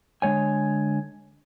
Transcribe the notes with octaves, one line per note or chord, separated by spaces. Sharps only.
D3 G#3 C#5 G#5